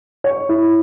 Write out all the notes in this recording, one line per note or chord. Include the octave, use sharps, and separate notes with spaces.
C#5
E4